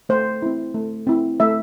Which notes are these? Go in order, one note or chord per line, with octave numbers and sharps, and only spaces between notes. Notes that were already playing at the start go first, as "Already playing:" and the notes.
A3 C5
C4 E4
A3
C4 E4
A3 E5